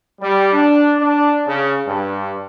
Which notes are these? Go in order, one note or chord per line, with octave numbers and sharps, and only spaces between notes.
G3
D4
D4
C#3
G2